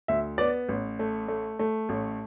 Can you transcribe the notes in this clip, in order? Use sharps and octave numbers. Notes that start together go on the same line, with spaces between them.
D2 E5
B3 D5
A1
A3
A3
A3
A1